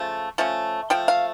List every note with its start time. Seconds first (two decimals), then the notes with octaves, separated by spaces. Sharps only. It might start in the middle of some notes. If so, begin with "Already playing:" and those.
Already playing: C#3 F3 A3
0.38 F3 A3 C#4
0.90 F3 A3 G5
1.08 F5